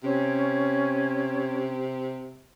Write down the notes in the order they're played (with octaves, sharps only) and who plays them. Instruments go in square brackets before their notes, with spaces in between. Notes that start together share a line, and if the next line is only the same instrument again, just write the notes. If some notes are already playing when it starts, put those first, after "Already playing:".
[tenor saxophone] C3 [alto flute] C#4